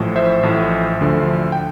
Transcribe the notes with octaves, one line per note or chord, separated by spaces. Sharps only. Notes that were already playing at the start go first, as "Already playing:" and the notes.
Already playing: A1 A2 F3
C5 E5
A1 A2 F3
D2 D3 F3
G5